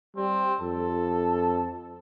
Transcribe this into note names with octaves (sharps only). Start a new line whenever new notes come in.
G3 C4
F2 A4